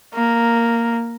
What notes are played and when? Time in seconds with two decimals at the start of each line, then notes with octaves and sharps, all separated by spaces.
0.14 A#3